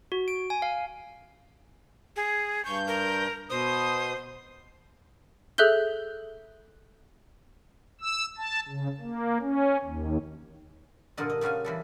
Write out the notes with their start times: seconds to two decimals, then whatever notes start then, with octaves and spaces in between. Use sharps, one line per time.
0.12 F#4
0.28 D7
0.50 G#5
0.62 F5
2.16 G#4
2.65 G2 C#6 G6
2.87 A#4
3.50 B2 C5 D#6
5.58 G#4 A4 E5 F#6 G6 G7
8.01 E6
8.38 A5
8.69 C#3
9.01 A#3
9.41 C#4
9.84 D#2
11.17 G2 A#2 D3 A4 A#4 D#5
11.30 D#5
11.41 C#3 G3 F#4 F5 G#5
11.65 E3 G3 A4